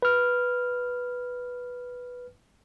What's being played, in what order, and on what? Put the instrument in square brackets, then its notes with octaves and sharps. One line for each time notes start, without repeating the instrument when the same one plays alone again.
[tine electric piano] B4 F6